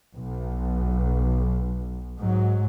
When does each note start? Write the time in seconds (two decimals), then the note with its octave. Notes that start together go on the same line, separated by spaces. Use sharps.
0.15 B1
2.19 G#2 F#3